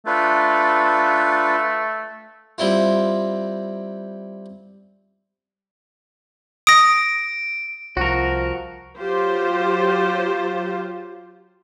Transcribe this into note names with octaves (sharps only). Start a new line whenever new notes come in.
A3 D4 F4 B4
G3 C4 E4 F4
D#6 A#6 D7
C2 F3 F#4 A#4
F#3 F4 G4 C5